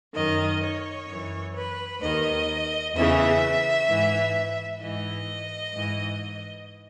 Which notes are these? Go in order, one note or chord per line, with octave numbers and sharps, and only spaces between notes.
F#2 D#3 D#5
C#5
F#2 E3
B4
D#2 D#3 D#5
E2 C#3 E3 E5
G#2 E3
G#2 E3 D#5
G#2 E3